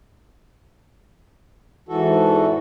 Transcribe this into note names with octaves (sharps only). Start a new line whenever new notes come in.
E2 G#2 E3 F#4 A4